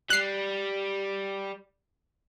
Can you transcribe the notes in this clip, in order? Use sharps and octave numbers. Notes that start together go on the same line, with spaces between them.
G3 F#6 C7